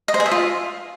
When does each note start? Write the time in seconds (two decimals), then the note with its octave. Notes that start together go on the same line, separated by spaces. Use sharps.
0.08 D#5
0.14 C5
0.20 G#4
0.26 E5
0.31 F4